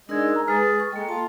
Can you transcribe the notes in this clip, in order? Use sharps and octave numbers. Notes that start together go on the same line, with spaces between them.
G#3 D4 D#4 A#4 D5 E6 G#6
A#5
G#3 G#4 B4 F6 A6
C#6
G#3 A#3 A4 G5
F4 A5